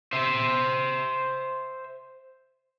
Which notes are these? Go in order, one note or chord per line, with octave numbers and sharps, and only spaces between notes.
C5 E5